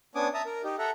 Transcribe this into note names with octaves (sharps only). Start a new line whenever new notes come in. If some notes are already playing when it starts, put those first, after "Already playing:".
B3 C#4 D4 G#5 D6 D#6
E5 A5 A#5 D#6
A#4
D#4 G4
A4 E5 F#5 A#5